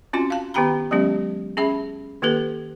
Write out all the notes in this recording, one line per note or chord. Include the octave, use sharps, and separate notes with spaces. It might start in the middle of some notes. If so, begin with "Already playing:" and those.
C4 C#4 F4 F#4 G#5 C6
F5 A5
D#3 B3 G4 G5 A#5 B5
F#3 G#3 B3 C#4 G4
C#4 G#4 E5 B5
D#3 A#3 G4 A4 B4